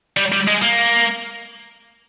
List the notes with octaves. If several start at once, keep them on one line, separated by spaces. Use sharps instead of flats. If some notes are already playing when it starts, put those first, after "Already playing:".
G3
G3
G#3
A#3